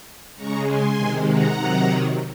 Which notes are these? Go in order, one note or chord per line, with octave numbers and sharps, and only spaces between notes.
C#3 G#3 A#5 C#6
G#5 C6
C3 D#3 G#3
F#5 A#5
C3 D#3 F#3